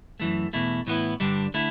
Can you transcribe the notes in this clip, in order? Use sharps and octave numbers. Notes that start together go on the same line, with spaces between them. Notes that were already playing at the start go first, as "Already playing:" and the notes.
F#2 E3 A3
E2 B2 A3 E4
A2 E3 B3 E4
G2 D3 G3 D4
D3 A3 E4